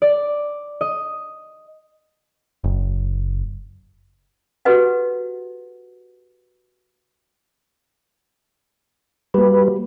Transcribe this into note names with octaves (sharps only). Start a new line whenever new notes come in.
D5
D#5
F#1
F#4 G4 A4 B4 D#5 F#5
G3 A#3 F#4 G4 B4